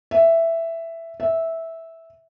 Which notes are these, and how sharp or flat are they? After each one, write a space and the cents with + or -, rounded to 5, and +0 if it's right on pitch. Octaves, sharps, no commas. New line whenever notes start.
E5 +5
E5 -10